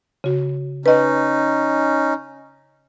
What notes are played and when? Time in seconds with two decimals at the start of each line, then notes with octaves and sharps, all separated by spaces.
0.24 C#3 F#4
0.86 C#4 D#4 B4 D#5